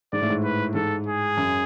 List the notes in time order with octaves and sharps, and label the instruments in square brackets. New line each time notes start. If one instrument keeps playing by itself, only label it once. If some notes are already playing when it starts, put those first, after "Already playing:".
[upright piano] G#2 [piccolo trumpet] D5
[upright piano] A2
G#2
[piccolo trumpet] B4
[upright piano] G#2 [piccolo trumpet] A4
[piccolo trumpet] G#4
[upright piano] F#2